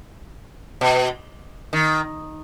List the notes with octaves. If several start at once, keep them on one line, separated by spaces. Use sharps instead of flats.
B2
D#3